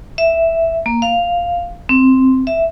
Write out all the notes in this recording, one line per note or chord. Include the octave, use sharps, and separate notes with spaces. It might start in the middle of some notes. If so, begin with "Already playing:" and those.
E5
A#3
F5
C4
E5